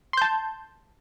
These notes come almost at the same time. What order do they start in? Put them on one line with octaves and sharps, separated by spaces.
C6 G6 A5